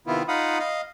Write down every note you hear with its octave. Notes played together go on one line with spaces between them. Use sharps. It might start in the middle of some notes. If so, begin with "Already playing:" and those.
C3 D#3 B3 E4 F4
D#4 F4 F5 F#5 B5 D#6
D#5 F5